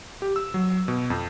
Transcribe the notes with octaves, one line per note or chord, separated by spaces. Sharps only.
G4
E6
F#3
B2
F2